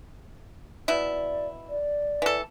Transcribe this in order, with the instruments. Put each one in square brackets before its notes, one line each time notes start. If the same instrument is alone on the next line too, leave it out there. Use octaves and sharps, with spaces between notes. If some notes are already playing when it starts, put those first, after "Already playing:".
[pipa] B2 E4 [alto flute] D5
[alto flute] D5
[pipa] E3 A4